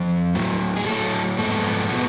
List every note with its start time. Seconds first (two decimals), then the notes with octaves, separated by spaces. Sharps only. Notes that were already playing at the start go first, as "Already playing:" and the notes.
Already playing: F2 F3
0.35 A2 F#3 A3
0.76 G#4
0.86 A2 F#3 A3 A4
1.38 G#2 F3 G#3 B3 A4
1.89 B2 G#3 B3